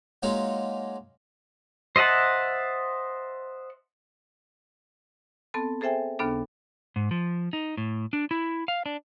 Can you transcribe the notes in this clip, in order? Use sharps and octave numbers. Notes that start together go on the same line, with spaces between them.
F#3 G#3 A#3 C#4 D#4 F4
C5 D#5 E5 F#5 A5
B3 C4 A4 A5
G#4 A4 C5 E5 G5 G#5
D#2 C#3 B3 D4 A4
G#2
F3
D#4
A2
D4
E4
F5
D4